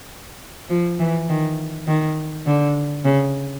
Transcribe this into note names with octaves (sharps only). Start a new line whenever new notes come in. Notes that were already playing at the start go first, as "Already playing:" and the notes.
F3
E3
D#3
D#3
D3
C#3